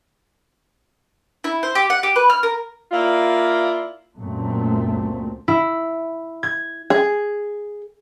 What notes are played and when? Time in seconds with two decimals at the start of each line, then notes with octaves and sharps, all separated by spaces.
1.44 E4
1.63 C5
1.75 G4
1.90 F#5
2.03 G4
2.16 B4
2.30 F6
2.43 A#4
2.91 A#3 E4 F4 D5
4.18 C#2 F#2 A#2 A3 C4
5.48 E4
6.43 G#6
6.90 G#4